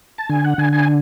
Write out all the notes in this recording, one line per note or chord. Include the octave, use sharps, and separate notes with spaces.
A5
D3 G#5
F#5
D3 G#5
G#5